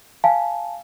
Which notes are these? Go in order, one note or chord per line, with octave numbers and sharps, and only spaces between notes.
F5 G#5 A5